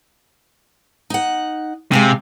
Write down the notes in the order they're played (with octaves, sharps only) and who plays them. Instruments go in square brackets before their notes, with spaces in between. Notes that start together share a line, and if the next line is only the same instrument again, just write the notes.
[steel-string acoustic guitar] D#4 F#5
[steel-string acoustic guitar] D2 G#3 F5 [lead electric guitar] C3